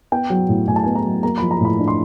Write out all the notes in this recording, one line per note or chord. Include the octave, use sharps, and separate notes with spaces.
B3 G5
F#3
A2
A2 G#5
A5
B3 G#5
A#5
F#3
A#3 A#5
F3 B5
A#5
A2 B5
D4
C6